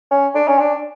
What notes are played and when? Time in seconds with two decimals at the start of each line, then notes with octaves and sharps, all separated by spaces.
0.11 C#4
0.35 D4
0.47 C#4
0.59 D4